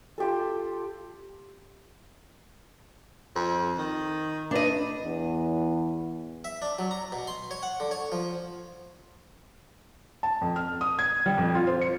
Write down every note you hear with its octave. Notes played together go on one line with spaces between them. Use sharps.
F4 G4 A4
F2
D#3
D4 B4 D#5
E2
E5
D4
F#3
A#5
B2
C6
C#5
F#5
D3
C#5
F3
A5
F2
F6
D#6
G#6
G3
F2
F4
C5
C#7